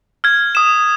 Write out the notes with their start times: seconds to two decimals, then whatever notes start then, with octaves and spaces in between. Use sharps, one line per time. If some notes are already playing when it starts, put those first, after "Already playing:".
0.24 F6 G#6
0.55 D#6 E7